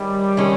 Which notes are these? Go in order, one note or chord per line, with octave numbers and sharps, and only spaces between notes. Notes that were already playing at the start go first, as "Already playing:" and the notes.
Already playing: D#3 G3 G#3 C#4
D#3 G#3 C#4